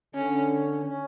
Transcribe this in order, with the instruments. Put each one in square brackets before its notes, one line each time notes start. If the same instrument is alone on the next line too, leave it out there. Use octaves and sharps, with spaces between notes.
[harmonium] D3 [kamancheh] C#4
[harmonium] C#4
C#4